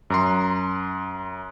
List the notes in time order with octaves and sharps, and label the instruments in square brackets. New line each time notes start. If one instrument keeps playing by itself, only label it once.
[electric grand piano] F#2 A#5 C6